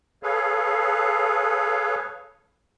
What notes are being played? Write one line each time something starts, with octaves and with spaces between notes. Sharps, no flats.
G#4 A4 B4 C#5 F5